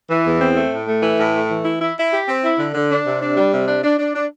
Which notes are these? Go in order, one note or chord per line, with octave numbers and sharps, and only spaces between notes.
E3
E2
C4
A3
A2
A3
E3
A2
A3
E3
E4
E4
E4
G4
C4
E4
D3
D3
D4
C3
D4
G3
C3
D4
D4
D4
D4